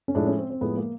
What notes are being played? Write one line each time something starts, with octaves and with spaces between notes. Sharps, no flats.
C#4
A2 F3 G#3 D4
C#4
C4
C4
A2 F3 G#3 B3
A#3